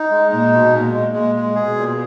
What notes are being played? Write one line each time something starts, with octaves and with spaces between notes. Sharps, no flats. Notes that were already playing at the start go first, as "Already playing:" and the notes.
Already playing: D#4
G#3
A#2 D#4
B2
A#2 G#3
G#3
A#2 G#3
G#3
B2 G#4
A#2